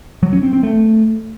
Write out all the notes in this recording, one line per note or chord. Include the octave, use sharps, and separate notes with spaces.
F#3
C#4
C4
C4
A3